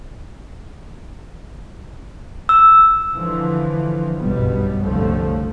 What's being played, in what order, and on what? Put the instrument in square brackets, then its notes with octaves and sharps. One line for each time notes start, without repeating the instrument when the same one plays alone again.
[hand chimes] E6
[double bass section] D3 E3 F3
F#1 B1 G2 B2 G3 B3
F#1 C2 A2 D3 F3 A3